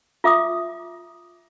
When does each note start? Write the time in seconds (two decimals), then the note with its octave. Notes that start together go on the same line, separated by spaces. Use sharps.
0.24 F4 E5 D6 D#6